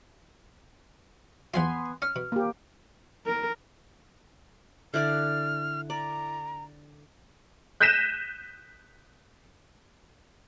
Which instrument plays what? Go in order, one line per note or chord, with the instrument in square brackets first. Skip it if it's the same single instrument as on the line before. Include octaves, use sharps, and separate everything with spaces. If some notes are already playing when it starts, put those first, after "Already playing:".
[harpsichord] E2 F3 F4 [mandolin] B3 G#5 C6
[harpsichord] C#4 [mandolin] F6
[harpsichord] B2
[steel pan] A#3 G4
[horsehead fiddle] A#4
[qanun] D3 E4 D5 [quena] F6
[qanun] D5 [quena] A#5
[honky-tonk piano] F#6 G6 A#6 B6 D#7 E7